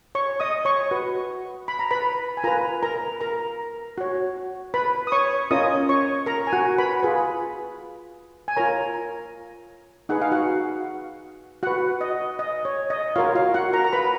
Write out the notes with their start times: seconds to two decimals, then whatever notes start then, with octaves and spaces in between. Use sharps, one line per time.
0.15 C#5 C#6
0.40 D#5 D#6
0.65 C#5 C#6
0.91 F#4 B4
1.68 B5
1.79 A#5
1.91 B4 B5
2.37 G#5
2.44 F4 A#4 B4 A#5
2.83 A#4 A#5
3.21 A#4 A#5
3.98 F#4 C#5
4.74 B4 B5
5.07 D#6
5.12 C#5 C#6
5.51 C#4 F4 A#4 C#5 D#5 D#6
5.89 C#5 C#6
6.26 A#4 A#5
6.47 G#5
6.53 F#4 F#5
6.78 B4 B5
7.03 F4 G#4 B4
8.48 G#5
8.57 F4 A#4 C#5 A#5
10.09 D#4 G#4 B4 F#5
10.22 F5
10.32 F#4 F#5
11.63 F#4 B4 F#5
12.01 D#5
12.39 D#5
12.65 C#5
12.90 D#5
13.16 F4 F#4 A#4 C#5 F5
13.35 F4 F5
13.54 F#4 F#5
13.73 A#4 A#5
13.84 A#5
13.93 B4 B5